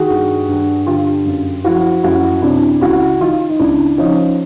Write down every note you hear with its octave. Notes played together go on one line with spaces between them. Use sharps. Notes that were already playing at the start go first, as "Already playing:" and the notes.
Already playing: D#3 F#4 G#4
G2
G2
D3 F4 G4
F#2
F3 E4 F#4
F#2 E4 F#4
C3 D4 E4
C#2 E4 F#4
D#3 D#4 F4
D#4
C#2 D4 E4
F3 C#4 D#4